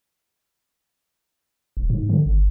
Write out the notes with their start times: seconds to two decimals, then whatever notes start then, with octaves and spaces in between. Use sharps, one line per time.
1.77 D#1
1.90 G#2
2.09 D3
2.26 G1